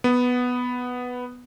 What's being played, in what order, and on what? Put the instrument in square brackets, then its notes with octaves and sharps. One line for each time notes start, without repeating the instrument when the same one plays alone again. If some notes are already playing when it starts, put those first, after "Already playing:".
[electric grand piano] B3